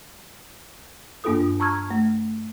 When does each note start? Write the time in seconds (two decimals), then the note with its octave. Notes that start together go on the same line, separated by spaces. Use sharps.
1.24 G2 A#3 D4 F4 A4 D#6
1.60 A5 A#5 C#6 E6 F6 G#6
1.91 A3